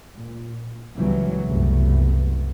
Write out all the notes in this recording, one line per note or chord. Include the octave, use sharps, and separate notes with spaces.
A#2
C#2 C#3 E3 F#3 G3 B3
F#1 C2 F#2 A3 B3